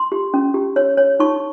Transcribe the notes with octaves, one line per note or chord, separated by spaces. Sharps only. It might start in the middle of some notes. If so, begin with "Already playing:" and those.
Already playing: C6
G4
C#4
G4
C#5
C#5
D#4 C#6